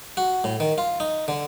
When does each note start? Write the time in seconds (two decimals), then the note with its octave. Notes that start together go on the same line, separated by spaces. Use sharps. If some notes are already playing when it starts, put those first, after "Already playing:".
0.17 F#4
0.44 A2
0.60 D#3
0.78 F4
1.00 D#4
1.28 D3